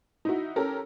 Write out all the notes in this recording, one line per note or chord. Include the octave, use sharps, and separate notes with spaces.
D#4 E4 F#4
C#4 G4 A4 A#4